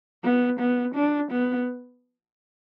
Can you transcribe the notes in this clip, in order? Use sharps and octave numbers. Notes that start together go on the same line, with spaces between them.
B3
B3
D4
B3